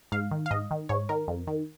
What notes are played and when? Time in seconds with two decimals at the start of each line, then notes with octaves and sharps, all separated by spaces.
0.12 G#2 F5
0.31 D#3
0.46 F5
0.51 G#2 D#5
0.71 D#3
0.89 G#2 C#5
1.09 D#3 A#4
1.28 F2
1.47 D#3